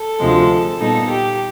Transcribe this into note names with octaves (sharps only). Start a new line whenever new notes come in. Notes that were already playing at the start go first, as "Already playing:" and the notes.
Already playing: A4
D2 C3 F3 G#3
A#2 G3 B3 D#4 A4
G4